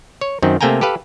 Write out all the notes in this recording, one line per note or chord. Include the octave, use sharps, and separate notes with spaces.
C#5
F#2 D#3 C4
C3 A3 A#3 G5 G#5 A#5
G4 A4 B4 F5